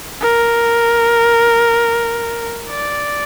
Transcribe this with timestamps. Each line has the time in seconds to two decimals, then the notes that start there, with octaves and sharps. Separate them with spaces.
0.21 A#4
2.69 D5